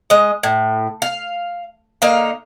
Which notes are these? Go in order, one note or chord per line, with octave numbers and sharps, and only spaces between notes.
G#3 D#5
A2
F5
D3 A#3 D#4 F5